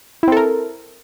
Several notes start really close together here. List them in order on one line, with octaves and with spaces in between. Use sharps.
E4 C4 A4 A#4